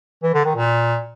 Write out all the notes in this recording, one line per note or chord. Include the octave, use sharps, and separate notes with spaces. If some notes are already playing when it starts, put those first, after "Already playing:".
E3
D3
D#3
A#2